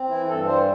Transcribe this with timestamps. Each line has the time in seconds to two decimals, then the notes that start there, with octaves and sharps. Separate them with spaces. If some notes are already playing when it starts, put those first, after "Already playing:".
Already playing: C4
0.09 E3 E4
0.27 G2 A4
0.46 G3 C5